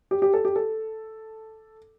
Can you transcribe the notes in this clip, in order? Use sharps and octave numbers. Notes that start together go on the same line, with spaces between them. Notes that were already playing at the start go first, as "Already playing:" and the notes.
G4
G4
A4
G4
A4